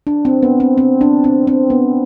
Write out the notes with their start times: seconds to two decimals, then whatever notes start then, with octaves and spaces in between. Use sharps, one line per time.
0.07 D4
0.25 C4
0.43 B3
0.60 C4
0.78 C4
1.01 D4
1.24 C4
1.47 C4
1.70 B3